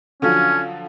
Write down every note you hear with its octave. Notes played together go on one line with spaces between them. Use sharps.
D3 F3 F#3 C#4